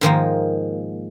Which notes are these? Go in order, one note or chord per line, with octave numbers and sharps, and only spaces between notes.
G#2 D#3 F3 A#3